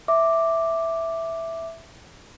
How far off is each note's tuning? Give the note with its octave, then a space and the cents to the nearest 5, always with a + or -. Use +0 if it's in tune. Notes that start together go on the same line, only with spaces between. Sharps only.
E5 +0 D6 +0